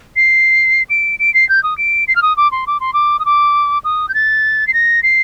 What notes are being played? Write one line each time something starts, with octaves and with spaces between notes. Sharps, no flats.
C7
D7
D7
C7
G6
D#6
D7
C7
F6
D#6
D6
C6
D6
C6
D6
D#6
D6
D#6
G6
A6
C7
A#6
C7